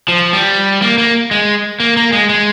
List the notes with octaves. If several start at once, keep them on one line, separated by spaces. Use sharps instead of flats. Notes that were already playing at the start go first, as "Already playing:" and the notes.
F3
G3
A#3
A#3
G#3
A#3
A#3
G#3
G#3